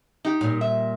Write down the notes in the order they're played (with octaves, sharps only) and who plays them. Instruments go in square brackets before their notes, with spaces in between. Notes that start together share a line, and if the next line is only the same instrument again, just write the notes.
[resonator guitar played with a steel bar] D#4 G4
[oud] A#2 G3
[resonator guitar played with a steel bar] E5